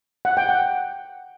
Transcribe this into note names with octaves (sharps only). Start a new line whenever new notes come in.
F#5
G5
F#5